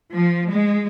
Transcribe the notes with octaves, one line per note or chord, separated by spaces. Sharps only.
F3
G#3